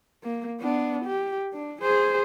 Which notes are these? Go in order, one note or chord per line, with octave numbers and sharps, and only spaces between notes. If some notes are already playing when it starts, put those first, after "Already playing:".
A#3
B3 D4
G4
D4
G#4 C5